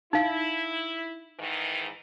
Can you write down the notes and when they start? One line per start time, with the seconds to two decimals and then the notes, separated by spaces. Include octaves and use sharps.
0.13 D#4 E4 F5
1.40 G#2 D#3 E3